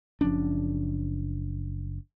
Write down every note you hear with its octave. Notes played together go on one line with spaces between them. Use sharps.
F#1 F3 C#4 D4